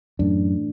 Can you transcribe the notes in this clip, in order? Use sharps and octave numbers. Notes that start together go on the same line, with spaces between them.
F#2 A2 E3 A3 D4